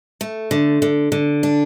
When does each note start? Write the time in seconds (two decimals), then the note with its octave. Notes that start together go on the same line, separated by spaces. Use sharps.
0.21 A3
0.51 D3
0.82 D3
1.12 D3
1.43 D4